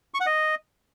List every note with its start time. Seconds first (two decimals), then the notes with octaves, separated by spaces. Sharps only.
0.14 C#6
0.20 F#5
0.26 D#5